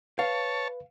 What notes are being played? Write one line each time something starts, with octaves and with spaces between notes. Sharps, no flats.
B4 C#5 F5 A5